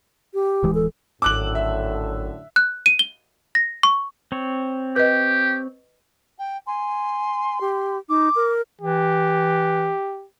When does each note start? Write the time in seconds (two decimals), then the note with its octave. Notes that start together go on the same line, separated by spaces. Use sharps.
0.34 G4
0.63 D1 E3 G#3
0.74 A4
1.22 G#1 F#2 A2 D3 D6 E6 F#6 F#7
1.55 E5
2.56 F#6
2.86 D#7
2.99 G7
3.55 A#6
3.83 C#6
4.32 C4 C#5
4.96 G4 B4 D#5
6.38 G5
6.67 G#5 C6
7.61 G4
8.09 D#4 D6
8.36 A#4
8.81 E3 G4